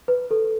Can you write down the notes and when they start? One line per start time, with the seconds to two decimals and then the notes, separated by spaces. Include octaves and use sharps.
0.08 B4
0.31 A4